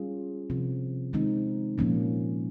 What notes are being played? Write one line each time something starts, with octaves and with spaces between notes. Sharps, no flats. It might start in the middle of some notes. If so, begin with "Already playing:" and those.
Already playing: G3 C#4 F4 G#4
C3 F3 C4 F4
D#3 G#3 C4 D#4
A#2 F3 A#3 C#4